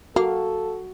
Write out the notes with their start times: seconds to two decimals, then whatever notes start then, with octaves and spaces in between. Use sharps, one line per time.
0.16 A#3 F#4 A4 F5